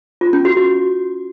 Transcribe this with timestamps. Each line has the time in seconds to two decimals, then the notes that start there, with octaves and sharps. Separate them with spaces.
0.21 F4
0.33 C#4
0.45 F#4
0.57 F#4